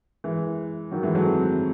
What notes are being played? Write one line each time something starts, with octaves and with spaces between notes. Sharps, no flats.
E3 G#3
D#3 F#3
E3 G#3
F#3 A3
G#3 C4